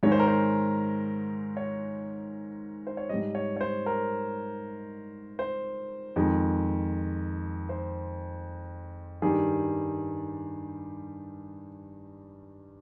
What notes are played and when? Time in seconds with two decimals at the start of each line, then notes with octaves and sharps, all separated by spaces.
0.03 G#2 D#3 G#3 C#5
0.12 C5
0.20 A#4
0.27 C5
1.57 C#5
2.87 C5
2.97 C#5
3.09 G#2 G3 D#5
3.35 C#5
3.56 C#5
3.61 C5
3.86 A#4
5.39 C5
6.16 F2 D#3 G#3
7.69 C5
9.22 G2 D#3 G3 G#4